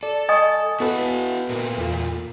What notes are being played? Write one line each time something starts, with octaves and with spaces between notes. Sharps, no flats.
A4 D5
D#5 G5 G#5 C#6 D#6
B3 E4 F#4 A4 B4
A#2 A3 A#4
E2 F4